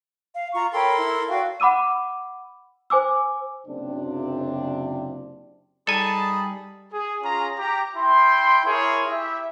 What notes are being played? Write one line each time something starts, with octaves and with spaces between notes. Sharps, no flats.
F5
F4 A#5 C#6
A4 A#4 C#5 G5 B5 C6
E4
F#4 D5 F5 G5
F#5 B5 D6 E6 D#7
C5 G#5 D6 E6
F#1 C3 C4 D4
G3 D#4 G#4 A4 G#5 A5 B5
G#4
C#4 F4 G#4 A#5
G4 A#5
E4 G5 C6
E4 G#4 A#4 C#5 C6
E4 G4 E5